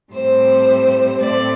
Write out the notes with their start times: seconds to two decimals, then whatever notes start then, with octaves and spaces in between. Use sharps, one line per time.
0.12 A2 G3 C4 C5
1.20 A2 A3 C4 D5